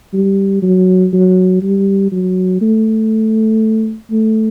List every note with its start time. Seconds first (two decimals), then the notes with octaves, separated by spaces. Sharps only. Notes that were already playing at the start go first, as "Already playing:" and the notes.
0.13 G3
0.62 F#3
1.13 F#3
1.62 G3
2.12 F#3
2.61 A3
4.11 A3